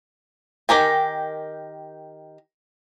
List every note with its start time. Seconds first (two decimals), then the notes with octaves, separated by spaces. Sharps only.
0.69 D#3 G4 A#4 G#5